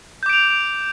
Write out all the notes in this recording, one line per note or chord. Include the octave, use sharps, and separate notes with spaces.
D6 G6 D7 F7